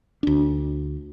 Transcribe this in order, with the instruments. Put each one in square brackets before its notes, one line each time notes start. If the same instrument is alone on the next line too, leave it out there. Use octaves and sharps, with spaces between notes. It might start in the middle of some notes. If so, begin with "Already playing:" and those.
[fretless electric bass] D2 D4